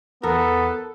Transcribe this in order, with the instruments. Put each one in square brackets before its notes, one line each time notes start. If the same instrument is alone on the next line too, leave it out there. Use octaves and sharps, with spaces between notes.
[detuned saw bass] E2 [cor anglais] B3 [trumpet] A4 [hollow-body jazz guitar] A#4